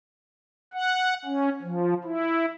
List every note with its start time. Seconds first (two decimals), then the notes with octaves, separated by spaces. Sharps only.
0.74 F#5
1.25 C#4
1.62 F3
2.04 E4